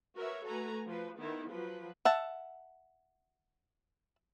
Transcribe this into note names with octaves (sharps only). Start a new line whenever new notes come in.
F#4 A#4 B4 C#5 E5
A3 F#4 A4 B4 G#5 A#5
F3 B4
D#3 B3 E4
F3 F#3 B4
E5 F#5 A5